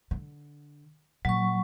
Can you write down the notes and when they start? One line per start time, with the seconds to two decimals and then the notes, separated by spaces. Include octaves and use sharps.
0.11 D3
1.25 A#2 F#3 C#6